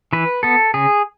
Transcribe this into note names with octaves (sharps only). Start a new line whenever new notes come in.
E3 B4
B3 A4
C#3 G#4